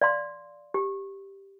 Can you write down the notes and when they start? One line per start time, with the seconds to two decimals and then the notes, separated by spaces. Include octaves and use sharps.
0.01 D5 F5 C6
0.74 G4